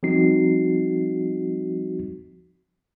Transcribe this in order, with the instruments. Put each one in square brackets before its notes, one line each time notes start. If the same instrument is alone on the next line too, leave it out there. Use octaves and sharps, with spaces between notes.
[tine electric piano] F3 G3 C4 D#4 F#4 C7